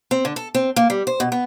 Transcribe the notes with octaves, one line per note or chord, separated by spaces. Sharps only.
C4
D3
A4
C4
A#3
G3
C5
B2
B3